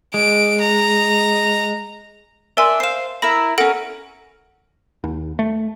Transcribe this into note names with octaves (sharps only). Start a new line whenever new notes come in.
G#3 D7
A#5
D4 A#4 D5 E5 G#5 C6
C5 F5 C7 E7
E4 A#4 A#5 B5
C#4 A4 A#4 F#5 D7
D#2
A3